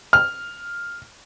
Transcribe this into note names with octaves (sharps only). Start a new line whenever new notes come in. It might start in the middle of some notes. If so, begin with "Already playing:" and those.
F6